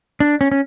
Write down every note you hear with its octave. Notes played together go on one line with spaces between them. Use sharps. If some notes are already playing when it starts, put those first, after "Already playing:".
D4
C#4
C#4